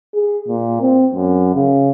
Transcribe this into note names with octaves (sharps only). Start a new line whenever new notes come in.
G#4
A#2
C4
F#2
C#3